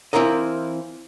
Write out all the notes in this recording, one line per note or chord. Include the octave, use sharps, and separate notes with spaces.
E3 C4 E4 F4 A#4 D#5